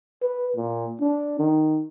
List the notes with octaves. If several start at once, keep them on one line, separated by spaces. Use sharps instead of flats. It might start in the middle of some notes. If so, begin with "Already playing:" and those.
B4
A#2
D4
D#3